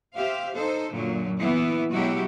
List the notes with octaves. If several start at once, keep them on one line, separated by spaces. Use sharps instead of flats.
G4 C5 E5 F5
D#4 A4 C5
F#2 A#2 D3 F#3
E3 B3 E4
B2 F#3 G#3 E4 F#4 G4